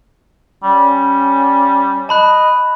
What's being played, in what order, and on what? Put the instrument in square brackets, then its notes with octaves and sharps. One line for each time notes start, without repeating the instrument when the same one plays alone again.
[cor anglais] G3 [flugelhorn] C#4
[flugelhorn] D#5 [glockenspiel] A5 B5 F#6